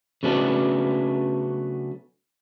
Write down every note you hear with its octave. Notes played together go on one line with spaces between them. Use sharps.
C#3 F#3 A3 B3 C#4 D4